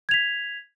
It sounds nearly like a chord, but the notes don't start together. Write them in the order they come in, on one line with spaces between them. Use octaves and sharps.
G#6 F7 B6